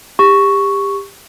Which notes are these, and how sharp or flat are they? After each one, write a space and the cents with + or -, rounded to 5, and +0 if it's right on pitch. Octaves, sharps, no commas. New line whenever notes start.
G4 +25 C#6 +0